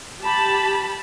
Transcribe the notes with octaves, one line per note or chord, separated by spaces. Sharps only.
G4 A5 B5